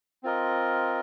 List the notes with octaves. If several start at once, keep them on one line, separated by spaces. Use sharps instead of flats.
C4 F4 A#4 D#5